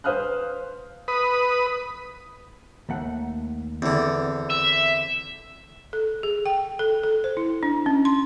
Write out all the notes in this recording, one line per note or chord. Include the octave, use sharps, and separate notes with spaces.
B4 C5 F5 D#6 F6 F#6
B4 D#6
D#2 A3 F#5
E2 D3 C4
E5
A4
G#4
G5
A4
A4
C5
E4
D4
C#4
C6